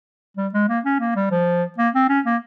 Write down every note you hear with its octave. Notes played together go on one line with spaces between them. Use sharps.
G3
G#3
A#3
C#4
A#3
G3
F3
A#3
C4
C#4
A#3